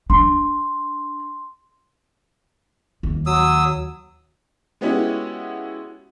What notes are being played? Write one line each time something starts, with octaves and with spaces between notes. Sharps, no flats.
D4 C6
D#2
F#3 D#6 E6
G#3 B3 C#4 E4 F#4 G4